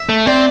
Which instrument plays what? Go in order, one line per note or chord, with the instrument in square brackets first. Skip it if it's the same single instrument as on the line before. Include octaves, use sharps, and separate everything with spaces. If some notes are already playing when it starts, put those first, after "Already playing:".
Already playing: [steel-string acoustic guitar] E5
[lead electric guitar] A3
[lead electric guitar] C4 [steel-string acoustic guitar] D5